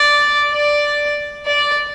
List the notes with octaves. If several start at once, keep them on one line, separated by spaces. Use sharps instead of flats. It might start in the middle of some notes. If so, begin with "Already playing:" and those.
Already playing: D5
D5
D5